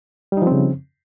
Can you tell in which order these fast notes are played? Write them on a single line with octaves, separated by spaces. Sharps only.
G3 D#4 F3 C4 C#3